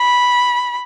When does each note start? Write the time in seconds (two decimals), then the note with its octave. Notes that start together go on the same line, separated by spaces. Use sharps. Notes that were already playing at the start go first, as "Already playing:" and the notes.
Already playing: B5